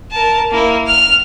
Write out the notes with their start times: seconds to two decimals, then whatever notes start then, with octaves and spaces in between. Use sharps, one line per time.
0.12 A#4 A5
0.51 A#3 E4
0.87 F6 F7